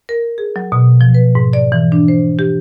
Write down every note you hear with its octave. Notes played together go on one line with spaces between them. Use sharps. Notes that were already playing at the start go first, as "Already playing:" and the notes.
A#4
G#4
F#3
B2
F3
B4
G#2
D5
E3
D4
C5
G4